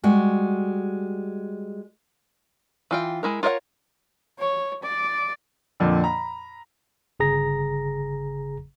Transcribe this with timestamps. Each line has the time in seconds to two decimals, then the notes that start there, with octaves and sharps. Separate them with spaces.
0.04 G3 G#3 F#4
2.91 E3 F4 G5
3.23 G#3 E4 A#4
3.43 F4 A#4 C#5 D#5 F#5
4.39 C#5
4.83 D5
5.80 F2 A#2 D3
6.04 A#5 B5
7.20 G1 C#3 G#4 A#5 A#6